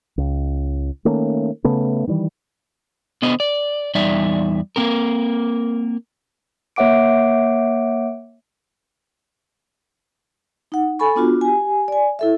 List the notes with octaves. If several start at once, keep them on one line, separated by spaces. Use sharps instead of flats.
C#2
D#3 A3 A#3 C#4
C#3 A3 B3
D#3 E3 G3
D3 B3 C5 D#5
D5
E2 G3 D#4 D5 E5
A#3 C4 A#4
A#3 C#5 E5 F#5 D6 D7
D#4 F#5
A4 G#5 B5 C#6
B3 D4 F4 F#4
G4 G#5
D5 G#5
E4 A4 E5